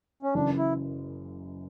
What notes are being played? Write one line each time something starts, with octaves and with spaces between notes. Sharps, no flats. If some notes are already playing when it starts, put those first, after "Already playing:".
C#4
F#1 F#2 E3 D4
E4